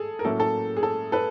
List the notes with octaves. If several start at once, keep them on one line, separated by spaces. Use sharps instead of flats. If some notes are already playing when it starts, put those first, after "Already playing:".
Already playing: G#4 A4
A#4
A2 F#3 A#3 C#4 E4 A4
A4
G#4
A4
A4 B4